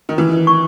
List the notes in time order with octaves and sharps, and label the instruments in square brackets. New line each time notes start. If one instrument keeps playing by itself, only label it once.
[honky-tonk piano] D#3
[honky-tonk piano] E3 [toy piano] B4
[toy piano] C#6